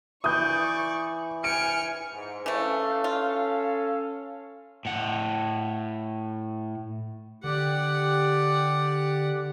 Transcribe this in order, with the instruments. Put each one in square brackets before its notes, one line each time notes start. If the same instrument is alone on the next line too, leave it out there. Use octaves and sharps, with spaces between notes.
[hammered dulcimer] E3 [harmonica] D5 [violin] C#6 [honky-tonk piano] D#6 G6
[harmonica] G5 F6 [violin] G#5 C#7 [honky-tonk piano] D7
[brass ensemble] G#2
[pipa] E3 A3 [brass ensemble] C#4 A4 F5
[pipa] F4
[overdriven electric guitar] A2 F#5
[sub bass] D3 [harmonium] G4 [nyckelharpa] D5 F#5